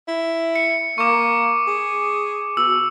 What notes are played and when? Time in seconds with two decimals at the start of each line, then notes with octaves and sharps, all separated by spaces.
0.08 E4
0.56 C#7
0.98 A#3 C#6 D6
1.67 G#4
2.57 B2 E6